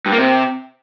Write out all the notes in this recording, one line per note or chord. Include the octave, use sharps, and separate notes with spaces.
G2
A#3
C3